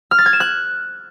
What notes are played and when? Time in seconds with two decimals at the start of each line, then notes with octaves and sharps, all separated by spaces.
0.11 F6
0.19 A6
0.26 G#6
0.33 E7
0.40 F#6